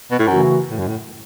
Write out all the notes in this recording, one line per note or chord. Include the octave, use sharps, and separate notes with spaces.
B2
A2
F#2 C#3 E3 A3 F#4
A2
F#2
A2